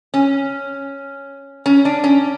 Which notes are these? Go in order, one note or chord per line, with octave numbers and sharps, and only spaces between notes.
C#4
C#4
D4
C#4